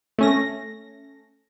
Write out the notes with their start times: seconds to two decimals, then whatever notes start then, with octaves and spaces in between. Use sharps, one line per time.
0.18 A3 C#4 A#6